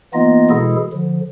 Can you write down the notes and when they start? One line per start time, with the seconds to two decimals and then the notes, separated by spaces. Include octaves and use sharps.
0.14 E3 A#3 B3 D#4 F4 D#5
0.50 B2 E3 G#3 E4 G#4 A4
0.93 D3 F3